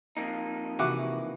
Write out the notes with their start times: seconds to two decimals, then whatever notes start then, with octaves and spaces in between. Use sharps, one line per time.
0.17 F2 A#3 D#4
0.79 C3 E3 F#4 F#5 D6